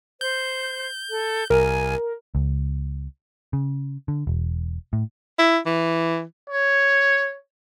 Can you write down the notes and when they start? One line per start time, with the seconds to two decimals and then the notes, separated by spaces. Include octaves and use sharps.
0.21 C5 G6
1.10 A4
1.50 C2 A#4 G#5
2.35 C#2
3.53 C#3
4.08 D3
4.27 E1
4.93 A2
5.39 E4
5.66 E3
6.50 C#5